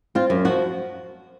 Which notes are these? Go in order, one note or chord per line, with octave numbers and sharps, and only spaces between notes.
C4 F4
F#2
F3 F#4